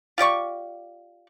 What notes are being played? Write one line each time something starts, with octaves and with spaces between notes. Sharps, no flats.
F4 G4 D5 C#6